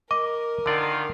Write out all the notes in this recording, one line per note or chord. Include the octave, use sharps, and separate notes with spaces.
A#4 D#5 D6
D3 D#3 F4 D5